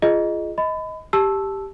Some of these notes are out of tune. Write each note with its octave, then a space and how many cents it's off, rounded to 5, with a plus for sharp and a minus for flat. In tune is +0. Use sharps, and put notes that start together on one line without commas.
F4 -25 G#4 +5 D#5 -5
D#5 +20 B5 +30
G4 +0 A5 -10 E6 +0